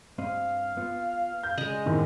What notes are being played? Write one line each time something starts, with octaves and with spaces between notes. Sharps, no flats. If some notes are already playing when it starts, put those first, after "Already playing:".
G2 C4 D#5 F5
B3 F4
G6
C#3 G#3 D#5
D#2 A2 D#3 C4